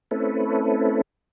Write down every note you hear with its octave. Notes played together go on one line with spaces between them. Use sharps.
A3 C4 C#4 E4 A4 B4